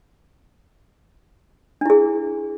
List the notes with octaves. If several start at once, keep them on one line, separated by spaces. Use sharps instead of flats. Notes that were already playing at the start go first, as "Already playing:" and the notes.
D4 E4 G#4